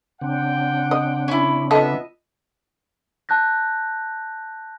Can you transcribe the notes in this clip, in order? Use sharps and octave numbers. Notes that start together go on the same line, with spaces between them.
C#3 C4 D4 F#5 G5
D#5
C#4 E4
B3 F4 A4 D#5 E5
A5 F#6 G6 A#6